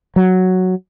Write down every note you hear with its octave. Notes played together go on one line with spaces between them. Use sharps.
F#3